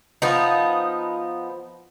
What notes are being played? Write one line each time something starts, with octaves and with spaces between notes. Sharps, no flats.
F3 B3 D#4